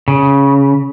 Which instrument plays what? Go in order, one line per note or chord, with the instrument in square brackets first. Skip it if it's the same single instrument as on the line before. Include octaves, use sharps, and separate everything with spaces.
[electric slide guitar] C#3